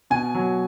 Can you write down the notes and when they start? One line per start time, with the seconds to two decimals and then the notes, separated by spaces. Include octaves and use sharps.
0.10 B2 G#5
0.35 F#3